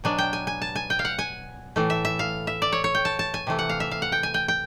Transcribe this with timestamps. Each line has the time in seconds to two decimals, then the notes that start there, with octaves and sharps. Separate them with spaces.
0.04 B2 F#3 B3 D4 G#5
0.18 G5
0.33 G#5
0.47 G#5
0.62 A5
0.76 G#5
0.90 G5
0.99 F5
1.05 F#5
1.19 G#5
1.76 A2 E3 A3
1.90 E5
2.05 E5
2.19 F5
2.47 E5
2.62 D5
2.72 C#5
2.84 C#5
2.95 G5
3.05 A5
3.19 A5
3.34 G#5
3.47 C3 E3 A3
3.59 F#5
3.69 F5
3.80 E5
3.91 F5
4.02 F#5
4.12 G5
4.23 G#5
4.34 G5
4.48 G5